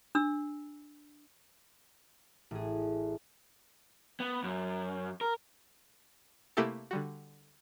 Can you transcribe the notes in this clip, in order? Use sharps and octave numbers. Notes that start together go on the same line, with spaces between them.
D4 E6
A1 G#4
B3
F#2
A#4
C3 A3 A#3 E4 G4 A4
D3 G3 F#4